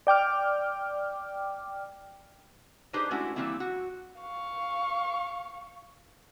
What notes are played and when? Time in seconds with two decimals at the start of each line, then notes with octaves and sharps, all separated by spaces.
0.07 D5 G5 D6 F6
2.93 D4 D#4 G4 G#4 B4 C5
3.11 G#3 A3 C#4 D4 E4 F#4
3.36 E3 G3 A#3 C4 E4
3.60 F#4
4.21 F5 C#6